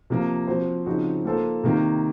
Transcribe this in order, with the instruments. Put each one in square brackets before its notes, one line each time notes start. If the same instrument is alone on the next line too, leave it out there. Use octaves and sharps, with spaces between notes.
[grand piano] C3 F3 A#3
F3 C4 F#4 C5
C#3 F3 C4 D#4 F#4
A#3 F4 A4 C5
C3 D#3 A#3